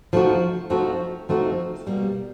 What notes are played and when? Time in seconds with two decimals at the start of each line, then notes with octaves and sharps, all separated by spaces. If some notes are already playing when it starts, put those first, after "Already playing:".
0.13 F3 A3 C4 D#4 F#4
0.70 F3 A3 C4 D#4 F#4
1.29 F3 A3 C4 D#4 F#4
1.87 B2 G3 A#3